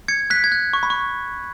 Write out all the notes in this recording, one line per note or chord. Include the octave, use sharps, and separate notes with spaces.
G#6 C#7
F#6 B6
G#6
F#6
C#6
B5
C#6